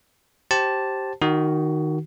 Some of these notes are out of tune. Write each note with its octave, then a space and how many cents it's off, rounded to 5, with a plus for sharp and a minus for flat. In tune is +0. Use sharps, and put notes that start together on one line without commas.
G4 -15 C5 +15 A5 +0
D#3 -5 F#4 +15